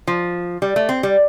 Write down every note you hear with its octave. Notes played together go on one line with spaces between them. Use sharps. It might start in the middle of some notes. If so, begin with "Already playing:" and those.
F3
G3
A3
C4
G3